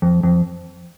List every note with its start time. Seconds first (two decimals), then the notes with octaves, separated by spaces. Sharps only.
0.02 F2
0.23 F2